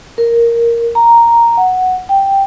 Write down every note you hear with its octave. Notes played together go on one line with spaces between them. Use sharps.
A#4
A#5
F#5
G5